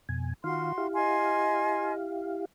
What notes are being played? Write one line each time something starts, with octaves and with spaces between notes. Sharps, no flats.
F2 B2 G#5
D#3 F4 F#4 F5 C6
E4 G4 F5
D#5 G#5 C6